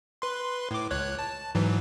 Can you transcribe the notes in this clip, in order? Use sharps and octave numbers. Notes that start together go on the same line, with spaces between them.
B4 C6
A2 D6
C#2 C#5 F#6
A5
G#2 E3 F#3